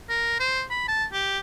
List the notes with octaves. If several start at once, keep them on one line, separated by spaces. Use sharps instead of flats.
A#4
C5
B5
A5
G4